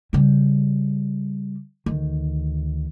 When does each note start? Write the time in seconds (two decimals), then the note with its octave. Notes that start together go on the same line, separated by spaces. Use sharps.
0.13 C#3 G3
1.86 D2 D#3